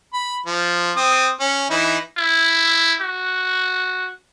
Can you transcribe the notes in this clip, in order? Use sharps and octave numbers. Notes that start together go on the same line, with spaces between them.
B5
F3
C4 D#6
C#4
E3 D#4 E4
E4
F#4